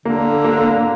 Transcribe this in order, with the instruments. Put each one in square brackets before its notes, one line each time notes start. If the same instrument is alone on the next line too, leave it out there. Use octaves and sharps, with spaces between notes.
[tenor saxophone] D3 [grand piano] A#3
[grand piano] A#3
A#3